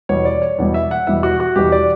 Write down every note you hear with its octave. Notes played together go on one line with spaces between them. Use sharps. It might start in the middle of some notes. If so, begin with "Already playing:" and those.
E2 B2 G3 C#5
D5
C#5
E2 B2 G3
E5
F#5
E2 B2 G3 E5
F#4
F#4
E2 B2 G3 G4
D5